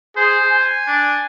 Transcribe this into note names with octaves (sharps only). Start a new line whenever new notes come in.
G#4 C5
G#5
D4